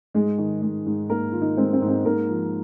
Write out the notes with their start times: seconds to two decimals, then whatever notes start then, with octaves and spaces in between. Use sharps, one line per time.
0.14 G#2 G#3 G#4
0.38 D#3
0.62 G#3
0.86 G#2
1.09 G#2 A#3 A#4
1.32 D#3 F4
1.42 D#4
1.57 G#3 C4
1.73 C4
1.82 G#2
1.89 C4
2.05 G#2 A#3 A#4
2.28 F3